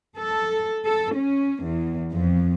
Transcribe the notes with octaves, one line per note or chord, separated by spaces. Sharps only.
A4
A4
C#4
E2
F2